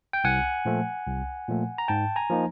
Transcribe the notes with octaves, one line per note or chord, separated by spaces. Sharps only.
G5
C2 F#5 G#5
A#2 F3 A3
C2
A#2 F3 A3
A#5
G#2 G5 A5
G#5 A#5
F3 A#3 D#4